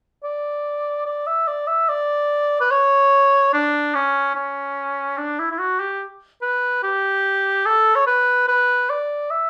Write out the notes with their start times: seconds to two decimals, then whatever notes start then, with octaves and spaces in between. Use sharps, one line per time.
0.24 D5
1.06 D5
1.27 E5
1.48 D5
1.68 E5
1.89 D5
2.61 B4
2.71 C#5
3.54 D4
3.95 C#4
4.35 C#4
5.18 D4
5.39 E4
5.51 E4
5.59 F#4
5.80 G4
6.42 B4
6.83 G4
7.66 A4
7.96 C#5
8.07 B4
8.48 B4
8.90 D5
9.31 E5